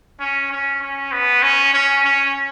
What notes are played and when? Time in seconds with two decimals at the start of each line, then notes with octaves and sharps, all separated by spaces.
0.20 C#4
0.51 C#4
0.82 C#4
1.12 B3
1.43 C#4
1.73 C#4
2.04 C#4